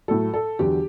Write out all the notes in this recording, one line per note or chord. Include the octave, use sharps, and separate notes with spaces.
A2 F#3 A4
A4
E2 D3 F#3 G4